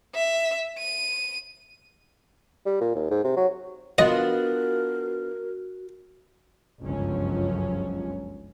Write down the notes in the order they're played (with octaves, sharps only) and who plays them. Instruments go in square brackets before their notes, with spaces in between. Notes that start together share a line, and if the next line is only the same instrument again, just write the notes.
[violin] E5
D#7
[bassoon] G3
A#2
D#2
G#2
C3
F#3
[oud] B3 D4 F4 [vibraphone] F#4 [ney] A#4 [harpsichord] D#5
[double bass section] G1 C#2 F#2 F3 F#3 C#4